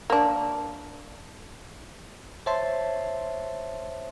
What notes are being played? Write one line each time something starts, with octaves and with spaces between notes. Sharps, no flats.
A#3 D4
C5 C#5 E5 A5 C6